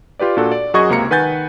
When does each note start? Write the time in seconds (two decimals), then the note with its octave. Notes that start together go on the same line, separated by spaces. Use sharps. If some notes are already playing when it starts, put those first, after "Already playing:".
0.19 F4 G4 B4 D5
0.37 A#2 D4 F#4 A4 F#5
0.52 D5
0.74 F#2 F#4 G#4 D#5 C#6 G#6
0.89 C#2 C3 A#3 A#5 C#7
1.11 D#3 B4 F#5 G#5 G6 A6